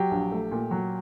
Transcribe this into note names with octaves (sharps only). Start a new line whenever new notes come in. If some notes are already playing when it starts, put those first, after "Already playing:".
Already playing: F#3 G4
A#1
A3
A#2
F#3